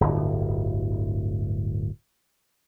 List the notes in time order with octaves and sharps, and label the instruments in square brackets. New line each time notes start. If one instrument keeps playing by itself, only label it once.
[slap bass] D1 G1